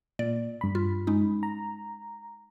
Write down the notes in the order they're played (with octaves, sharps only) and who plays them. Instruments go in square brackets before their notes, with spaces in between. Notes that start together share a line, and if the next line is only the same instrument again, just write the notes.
[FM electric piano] A#2 [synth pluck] D5
[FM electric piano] G2 B5
[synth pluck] F4
G#3 C#4 D#4
[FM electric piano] A#5